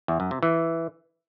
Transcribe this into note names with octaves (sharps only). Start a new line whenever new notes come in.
E2
F#2
C3
E3